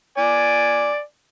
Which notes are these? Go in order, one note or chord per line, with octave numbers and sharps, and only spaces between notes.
D5 G#5